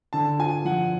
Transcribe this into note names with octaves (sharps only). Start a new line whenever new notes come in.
D3 A5
F4 G#5
F3 F#5